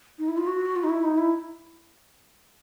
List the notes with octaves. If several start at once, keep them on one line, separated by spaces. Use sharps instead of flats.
D#4
E4
F4
F#4
F4
D#4
E4
D#4
E4